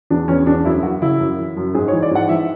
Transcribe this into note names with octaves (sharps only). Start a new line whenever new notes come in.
E2 D4
E2 C#4
E2 D4
F#2 E4
F#2 F#4
C#3 E4
F#2
E3
F#2
G#2 G#4
C#5
E3
D5
G#2 F#5
E3 E5